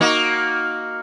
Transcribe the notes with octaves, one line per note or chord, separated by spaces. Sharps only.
A#3 D#4 F#4